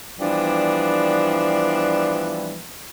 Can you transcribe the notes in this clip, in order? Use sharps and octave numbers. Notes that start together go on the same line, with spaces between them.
E3 F3 G3 B3 D4